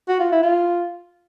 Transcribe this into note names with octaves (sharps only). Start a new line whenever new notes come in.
F#4
F4
E4
F4